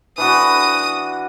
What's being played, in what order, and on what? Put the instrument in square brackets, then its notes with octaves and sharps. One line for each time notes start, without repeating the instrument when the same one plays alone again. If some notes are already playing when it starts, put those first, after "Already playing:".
[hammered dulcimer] E3 D4 F#4 [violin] D#6